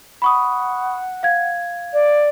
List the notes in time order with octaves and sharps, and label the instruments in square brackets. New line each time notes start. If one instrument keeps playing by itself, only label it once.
[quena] F#5 [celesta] B5 C#6 D#6
[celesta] F5 G#6
[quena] D5